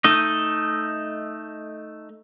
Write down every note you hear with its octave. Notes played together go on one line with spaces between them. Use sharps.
A3 D#4 D#5